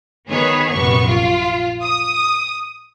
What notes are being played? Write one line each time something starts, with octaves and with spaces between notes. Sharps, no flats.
D#3 B3 G#4 C#5
A#1 F#2 C3 B3 C#6
F4
D#6